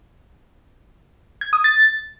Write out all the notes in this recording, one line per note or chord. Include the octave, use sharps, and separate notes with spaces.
G#6
D#6
A6